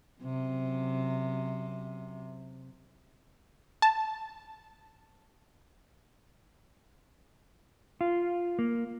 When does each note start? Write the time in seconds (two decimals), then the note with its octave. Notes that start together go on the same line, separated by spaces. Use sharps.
0.22 F#2 C3
3.82 A5
8.01 F4
8.59 A#3